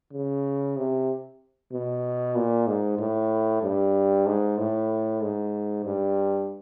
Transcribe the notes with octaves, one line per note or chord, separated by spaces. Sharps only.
C#3
C3
B2
A#2
G#2
A2
G2
G#2
A2
G#2
G2